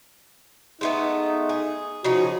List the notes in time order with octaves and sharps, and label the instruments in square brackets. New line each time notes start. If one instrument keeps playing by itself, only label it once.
[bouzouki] G#3 A3 B3 [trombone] D#4
[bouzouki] G#4
[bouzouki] C#3 D#4 G#4 [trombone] F3 [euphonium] F#4